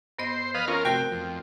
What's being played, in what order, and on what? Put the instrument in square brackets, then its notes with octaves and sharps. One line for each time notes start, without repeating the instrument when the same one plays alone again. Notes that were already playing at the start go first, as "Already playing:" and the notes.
[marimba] G2 B3 D#5 [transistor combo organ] C5
[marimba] F3 [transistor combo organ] B4 D#5 F5
[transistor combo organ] C#4 F4 A#4 [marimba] A#5
[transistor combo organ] C3 [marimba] A3 F#4 A#4 [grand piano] G5
[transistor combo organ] F2